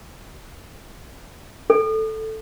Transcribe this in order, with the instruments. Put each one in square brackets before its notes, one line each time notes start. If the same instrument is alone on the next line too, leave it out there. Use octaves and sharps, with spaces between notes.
[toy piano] A4